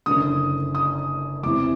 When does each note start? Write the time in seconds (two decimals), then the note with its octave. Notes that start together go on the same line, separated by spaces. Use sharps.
0.06 F#1 F#2 D3 D#6
0.75 D#6
1.43 E2 C3 E3 D6